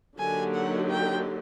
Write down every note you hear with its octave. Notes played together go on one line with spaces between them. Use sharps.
D3 F#3 A#3 D#4 G4 G#5
F#5
G5